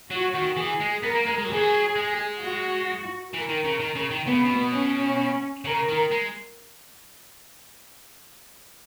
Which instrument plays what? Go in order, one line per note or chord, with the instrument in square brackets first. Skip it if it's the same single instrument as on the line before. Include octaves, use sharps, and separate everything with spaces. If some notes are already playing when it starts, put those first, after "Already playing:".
[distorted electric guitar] F#3 [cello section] F#4
[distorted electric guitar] D#3
[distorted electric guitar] E3 [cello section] G#4
[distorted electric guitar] G#3
[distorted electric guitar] B3 [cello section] A#4
[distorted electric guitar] A#3
G#3
G#3
F#3
[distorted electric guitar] E3 [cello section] G#4
[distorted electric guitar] F#3
G#3
[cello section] F#4
[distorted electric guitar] E3 [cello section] A#4
[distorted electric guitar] D#3
C#3
D#3
C#3
D#3
[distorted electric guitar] C#3 [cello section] B3
[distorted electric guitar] C#3
B2
[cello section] C#4
[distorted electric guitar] C#3 [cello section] A#4
[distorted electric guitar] D#3
G#3